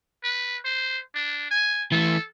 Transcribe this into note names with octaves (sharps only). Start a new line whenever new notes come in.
B4
C5
D4
G#5
E3 A3 A4